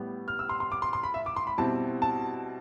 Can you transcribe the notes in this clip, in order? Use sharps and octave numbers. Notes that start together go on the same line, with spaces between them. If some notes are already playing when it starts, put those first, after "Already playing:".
Already playing: A2 G3 B3
F6
E6
C6
C6
D6
C6
C6
B5
E5
D6
C6
B5
B2 G3 C4 E4 A5
A5